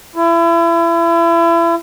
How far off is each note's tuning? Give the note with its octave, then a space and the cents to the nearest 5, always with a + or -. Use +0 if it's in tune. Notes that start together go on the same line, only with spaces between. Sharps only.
E4 +35